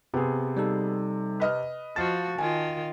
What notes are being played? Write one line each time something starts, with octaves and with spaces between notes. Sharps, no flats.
C3 B3 G#4
G3 D#4 A4
B4 D#5 F6
F3 F#4 F5 A5 A6
D#3 F4 G#5